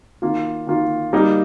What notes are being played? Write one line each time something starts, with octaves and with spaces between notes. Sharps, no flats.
D#3 A#3 F4
D#3 A#3 F4
G3 A#3 D#4